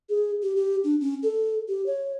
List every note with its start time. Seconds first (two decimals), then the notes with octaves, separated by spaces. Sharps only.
0.09 G#4
0.42 G4
0.56 G4
0.84 D4
1.01 C#4
1.23 A4
1.68 G4
1.86 C#5